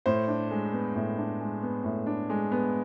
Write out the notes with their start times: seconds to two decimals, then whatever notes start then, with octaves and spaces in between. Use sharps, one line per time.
0.06 A2 C5
0.28 D4
0.51 G#3
0.73 B3
0.95 A2
1.18 D4
1.40 G#3
1.63 B3
1.84 A2
2.06 D4
2.30 G#3
2.52 B3